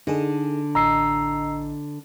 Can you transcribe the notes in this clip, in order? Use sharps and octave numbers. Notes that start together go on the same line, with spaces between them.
D3 D#4 G#4 A4
A1 D#5 A#5 E6 C7